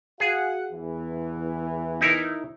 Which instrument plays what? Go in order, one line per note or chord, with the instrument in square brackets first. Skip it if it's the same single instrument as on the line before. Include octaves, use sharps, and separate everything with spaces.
[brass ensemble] F#4 F5 F#5 [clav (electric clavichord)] G#4
[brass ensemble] E2 E3
[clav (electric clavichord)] D#4 E4 A#4